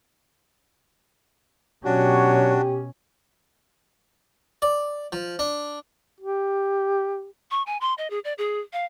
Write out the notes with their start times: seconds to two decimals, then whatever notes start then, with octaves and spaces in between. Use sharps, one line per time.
1.85 B2 F#3 C#4 D4 F#4 G4 C#5
4.62 D5
5.12 F3
5.39 D4
6.20 G4
7.51 C#6
7.66 G#5
7.81 C6
7.98 D#5
8.10 G#4
8.24 D5
8.38 G#4
8.73 F5